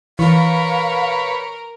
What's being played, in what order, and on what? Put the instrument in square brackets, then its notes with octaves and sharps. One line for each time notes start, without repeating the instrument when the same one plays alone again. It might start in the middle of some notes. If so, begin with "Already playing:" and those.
[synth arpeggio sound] E3 [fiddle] A#4 [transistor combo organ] B4 C#5 [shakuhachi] F5